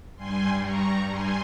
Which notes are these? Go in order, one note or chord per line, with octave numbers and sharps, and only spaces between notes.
G2 G3 G#5 C6
A#5 C#6
G#5 C6